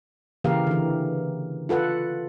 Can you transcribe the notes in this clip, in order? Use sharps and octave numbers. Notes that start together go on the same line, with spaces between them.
C#3 E3 A#3 G4 A#4 F5
D3 E3
F4 A4 B4 F#5